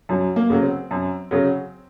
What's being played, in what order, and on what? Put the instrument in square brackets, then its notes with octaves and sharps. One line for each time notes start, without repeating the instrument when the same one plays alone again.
[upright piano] F#2 [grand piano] F#3
[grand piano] A#3
[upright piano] C#3 F#3
[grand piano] C4
[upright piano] F#2
C#3 F#3